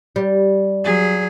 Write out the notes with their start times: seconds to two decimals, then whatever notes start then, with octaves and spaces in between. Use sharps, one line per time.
0.16 G3
0.84 F#3 G#4